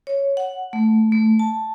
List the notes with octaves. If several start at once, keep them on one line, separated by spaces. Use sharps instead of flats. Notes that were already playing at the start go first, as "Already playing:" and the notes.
C#5
F#5
A3
A3
A5